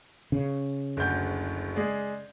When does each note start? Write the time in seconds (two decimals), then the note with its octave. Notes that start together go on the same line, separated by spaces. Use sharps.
0.32 C#3
0.97 F#1 D2 G6
1.76 G#3 G#4 D5